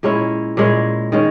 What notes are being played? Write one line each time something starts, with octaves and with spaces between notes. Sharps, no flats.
A#2 G#3 C#4 E4
A#2 G#3 C#4 E4
D#3 G#3 C#4